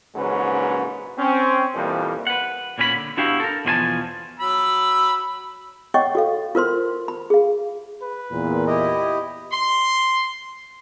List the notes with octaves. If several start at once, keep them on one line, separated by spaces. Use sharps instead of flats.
A#1 G#2 C#3 F#3 C#4 B4
C4 C#4
F2 A#2 E3 F3 G3 A#3
B4 F#5
A#2 A#3 C#4 F#4 G#4 B5
D3
B3 D4 E4 F#4 G4 F5
A4 A#4
E2 B2 F3 F4 G#5 A5
F#3 B5 E6
C#5 D#5 F#5 G5 C#6 D6
F#4 A4 F5
F4 A#4 C5 C6
B5
G#4 F5
B4
E2 A#2
E4 G4 D#5
C6